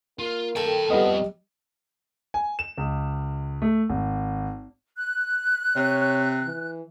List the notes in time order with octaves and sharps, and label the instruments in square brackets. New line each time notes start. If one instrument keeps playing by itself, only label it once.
[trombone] A#3 [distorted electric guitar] F4
[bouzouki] D#3 A4 [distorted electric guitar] G5 A5
[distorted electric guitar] F3 C4 [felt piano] G3 D#5 [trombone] B3
[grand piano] G#5
E7
C#2
A3
G#1
[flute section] F#6
[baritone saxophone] C3 [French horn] C#5
[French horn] E3